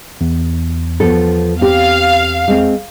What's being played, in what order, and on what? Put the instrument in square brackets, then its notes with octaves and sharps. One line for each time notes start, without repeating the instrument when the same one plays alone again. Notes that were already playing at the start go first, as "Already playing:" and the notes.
[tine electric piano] E2
[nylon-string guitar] F3 B3 A4
[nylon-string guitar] C4 G4 [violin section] F5
[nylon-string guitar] G#3 C4